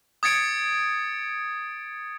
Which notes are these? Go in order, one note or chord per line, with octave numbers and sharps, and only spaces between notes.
D#6 G#6 A6 C#7 D7